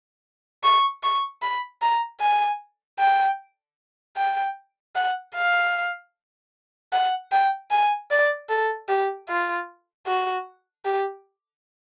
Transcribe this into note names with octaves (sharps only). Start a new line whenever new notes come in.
C#6
C#6
B5
A#5
G#5
G5
G5
F#5
F5
F#5
G5
G#5
D5
A4
G4
F4
F#4
G4